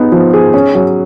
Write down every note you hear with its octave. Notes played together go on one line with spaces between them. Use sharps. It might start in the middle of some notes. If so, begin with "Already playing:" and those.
Already playing: B3 D#4 G#4
F3
G#4
C#4
F#3